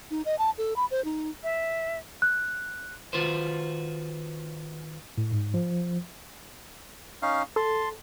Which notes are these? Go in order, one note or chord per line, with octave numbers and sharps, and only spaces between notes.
D#4
D#5
A5
A4
B5
C5
D#4
E5
F#6
D#3 F4 F#4 B4 C5
A2
G#2
F3
C#4 D#4 F5
A4 A5 C6